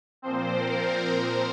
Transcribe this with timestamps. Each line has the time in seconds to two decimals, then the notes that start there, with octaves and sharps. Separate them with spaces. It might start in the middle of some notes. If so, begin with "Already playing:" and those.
0.22 A#2 F3 C4 C5
0.59 A#4